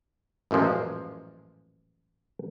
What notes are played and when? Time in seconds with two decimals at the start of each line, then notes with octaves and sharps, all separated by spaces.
0.51 A1 F#2 A#2 F3 G#3